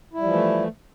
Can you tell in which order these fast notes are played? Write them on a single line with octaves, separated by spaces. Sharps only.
E4 G3 F3 E3 A3